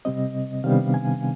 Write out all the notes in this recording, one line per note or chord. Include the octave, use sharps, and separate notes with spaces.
C3 G3 C4 D#5
C3 D#3 G3 B3 D4 F5
G#5